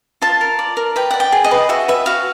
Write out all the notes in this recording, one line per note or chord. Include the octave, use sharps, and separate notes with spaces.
F4 A5
A#4
D5
A#4
B4 G5
D5 F#5
G5
G#4
D#5
B4
F#4 E5
B4 E5
F#4 F5